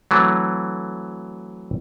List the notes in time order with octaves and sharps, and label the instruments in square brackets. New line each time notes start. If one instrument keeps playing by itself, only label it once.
[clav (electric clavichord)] E3 F#3 A3 C4